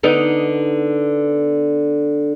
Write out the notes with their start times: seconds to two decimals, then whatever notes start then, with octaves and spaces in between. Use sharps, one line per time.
0.03 D3 B3 D#4